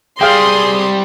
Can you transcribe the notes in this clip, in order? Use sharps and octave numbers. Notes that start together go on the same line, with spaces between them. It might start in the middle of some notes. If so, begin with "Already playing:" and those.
G3 C4 G#4 F5 G5 C6 D#6